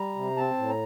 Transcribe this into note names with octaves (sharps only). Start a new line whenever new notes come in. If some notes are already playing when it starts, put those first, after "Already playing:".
Already playing: G3 A#5
C3
C4 A5
A2
A#5